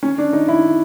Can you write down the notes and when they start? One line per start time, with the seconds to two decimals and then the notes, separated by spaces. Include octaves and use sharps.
0.03 C#4
0.18 D4
0.33 D#4
0.48 E4